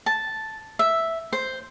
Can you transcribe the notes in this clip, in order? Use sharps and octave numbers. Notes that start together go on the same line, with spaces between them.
A5
E5
C5